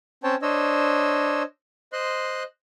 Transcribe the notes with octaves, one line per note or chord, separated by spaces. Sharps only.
C4 C#4 C5 C#5 G5 A5
D4 C5 C#5 D#5 E6
C5 D#5 C6 F#6